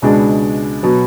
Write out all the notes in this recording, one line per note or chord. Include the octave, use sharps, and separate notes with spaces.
C#2 B2 G#3 D4 G#4
B2 F#3 B3